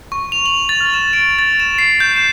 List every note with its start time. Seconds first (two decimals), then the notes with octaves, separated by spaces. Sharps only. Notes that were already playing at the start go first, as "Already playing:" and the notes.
0.12 C#6
0.32 F7
0.46 F#7
0.69 A6
0.81 F6
0.94 E7
1.13 D7
1.39 A6
1.60 E7
1.78 C7
2.00 G6
2.16 E7